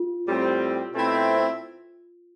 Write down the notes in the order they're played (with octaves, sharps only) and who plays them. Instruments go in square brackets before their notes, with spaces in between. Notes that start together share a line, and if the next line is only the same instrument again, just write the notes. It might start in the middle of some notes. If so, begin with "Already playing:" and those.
Already playing: [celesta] F4
[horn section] A2 G3 C4
B2 A3 C4 E4